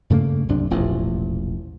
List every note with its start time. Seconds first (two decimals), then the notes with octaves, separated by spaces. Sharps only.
0.10 G2 C#3 A3 A#3
0.49 C2 F#2 C3 D4
0.70 E1 A1 A#2 F3